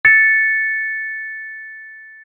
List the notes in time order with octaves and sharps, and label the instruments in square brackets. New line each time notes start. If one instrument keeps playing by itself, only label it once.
[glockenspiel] A6 C#7